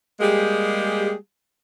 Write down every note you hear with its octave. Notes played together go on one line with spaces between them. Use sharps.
G3 G#3 A#3 G4 G#4